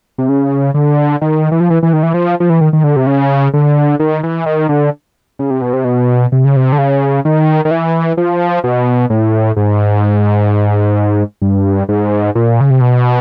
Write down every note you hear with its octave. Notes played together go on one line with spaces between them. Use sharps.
C3
C#3
D3
D#3
E3
F3
E3
E3
D#3
E3
F3
F3
E3
D#3
D#3
D3
C3
C#3
D3
D#3
E3
D#3
D3
C#3
C3
B2
C3
B2
C3
C#3
C3
D3
C#3
D#3
D#3
E3
F3
B2
A2
G#2
G2
G#2
A#2
C#3
C3
B2